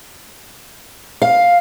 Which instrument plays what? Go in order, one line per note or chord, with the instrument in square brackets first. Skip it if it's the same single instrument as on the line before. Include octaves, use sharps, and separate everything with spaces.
[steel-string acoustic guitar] F5